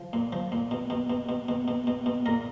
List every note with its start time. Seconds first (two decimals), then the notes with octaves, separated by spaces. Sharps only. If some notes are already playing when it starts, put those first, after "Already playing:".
Already playing: F3
0.13 A#2
0.32 F3
0.52 A#2
0.71 B2
0.90 B2
1.10 B2
1.29 B2
1.49 B2
1.68 B2
1.87 B2
2.06 B2
2.26 A#2 A#4